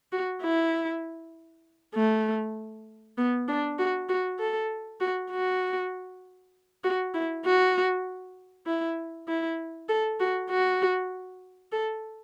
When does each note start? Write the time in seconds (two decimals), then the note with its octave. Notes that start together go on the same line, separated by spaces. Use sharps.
0.12 F#4
0.43 E4
1.96 A3
3.18 B3
3.48 D4
3.79 F#4
4.09 F#4
4.40 A4
5.01 F#4
5.31 F#4
6.84 F#4
7.14 E4
7.45 F#4
8.67 E4
9.28 E4
9.89 A4
10.20 F#4
10.50 F#4
11.72 A4